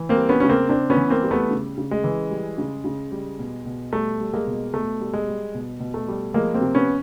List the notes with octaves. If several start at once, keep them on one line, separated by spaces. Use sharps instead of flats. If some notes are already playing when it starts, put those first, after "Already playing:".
Already playing: E3
A#3 C4
G3
B3 C#4
C#3 C#4
A#3 C4
C#3 C4 D4
B3 C#4
E3
A#3 C4
G3
A3 B3
C#3
C#3
G#3
E3
G3
C#3
C#3
G3
B2
B2
G3 A3
G3
G#3 A#3
B2
B2 A3
G3
G#3
G3
B2
B2
A3
G3
F3 G#3 A#3
A#3 C4
C3
B3 C#4